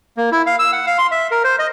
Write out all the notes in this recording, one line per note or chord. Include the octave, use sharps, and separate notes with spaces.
A#3
E4
F5
E6
F#5
F5
C6
E5
A#4
C5
D#5